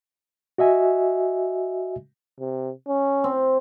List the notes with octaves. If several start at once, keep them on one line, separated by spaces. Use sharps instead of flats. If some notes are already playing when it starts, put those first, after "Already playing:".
F#4 D#5 E5 G#5
C3
C#4
C4